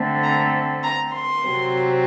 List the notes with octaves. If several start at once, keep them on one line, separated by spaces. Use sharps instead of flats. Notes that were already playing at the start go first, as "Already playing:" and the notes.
Already playing: D3 A3 C4
A#5
A#5
C6
C3 F#3 C4